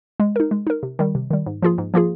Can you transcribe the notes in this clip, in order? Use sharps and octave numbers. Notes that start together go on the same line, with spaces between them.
G#3
D#4 A#4
G#3
D#4 A#4
C3
D#3 G3
C3
D#3 G3
G#2
F3 A#3 F4 G#4
G#2
F3 A#3 F4 G#4